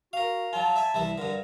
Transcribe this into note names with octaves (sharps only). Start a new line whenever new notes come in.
F#4 A#4 F5
F#3 F4 A5
E5 G#5
C2 E3 E5
G2 D3 A#4